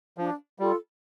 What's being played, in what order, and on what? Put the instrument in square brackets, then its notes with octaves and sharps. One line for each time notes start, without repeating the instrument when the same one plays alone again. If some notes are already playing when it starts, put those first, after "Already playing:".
[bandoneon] F3 [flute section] D4
[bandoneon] G3 [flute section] F4 A4